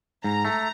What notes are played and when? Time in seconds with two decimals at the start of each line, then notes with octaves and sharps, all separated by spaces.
0.24 G#2 A#5
0.45 A3